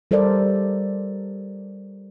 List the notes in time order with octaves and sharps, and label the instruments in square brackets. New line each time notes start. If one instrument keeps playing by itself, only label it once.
[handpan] G3 A4 A#4 C5 D5